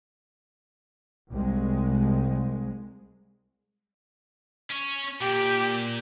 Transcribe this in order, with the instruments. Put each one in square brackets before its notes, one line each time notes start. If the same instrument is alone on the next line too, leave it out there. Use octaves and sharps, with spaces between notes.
[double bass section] C2 G#3
[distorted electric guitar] C#4 C#5
[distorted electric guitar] A#2 [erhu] G4